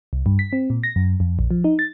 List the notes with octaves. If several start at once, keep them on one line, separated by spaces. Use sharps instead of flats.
C2
G2
B6
C4
A#2
A#6
F#2
F2
A#1
F3
D#4
A6